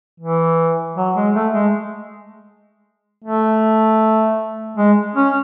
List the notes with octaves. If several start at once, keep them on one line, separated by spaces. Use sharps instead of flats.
E3
F#3
G#3
A3
G#3
A3
G#3
C#4